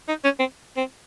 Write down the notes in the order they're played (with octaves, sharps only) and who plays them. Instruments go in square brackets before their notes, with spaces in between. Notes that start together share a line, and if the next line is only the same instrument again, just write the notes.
[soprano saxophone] D#4
C#4
C4
C4